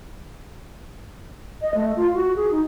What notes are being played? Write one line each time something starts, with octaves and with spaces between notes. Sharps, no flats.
D#5
A3
F4
F#4
G#4
D#4